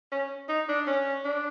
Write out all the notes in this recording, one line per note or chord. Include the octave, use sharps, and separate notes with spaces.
C#4
D#4
D4
C#4
D4